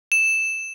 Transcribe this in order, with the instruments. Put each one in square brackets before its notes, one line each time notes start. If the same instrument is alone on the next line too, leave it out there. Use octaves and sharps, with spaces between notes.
[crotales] E7